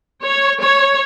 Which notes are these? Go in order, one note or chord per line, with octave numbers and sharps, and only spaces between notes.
C#5
C#5